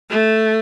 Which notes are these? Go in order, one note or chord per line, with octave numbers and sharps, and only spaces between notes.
A3